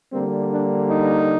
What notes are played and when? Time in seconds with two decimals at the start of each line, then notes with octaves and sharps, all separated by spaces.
0.13 D3 G3 A#3 C4
0.52 D4
0.90 D#4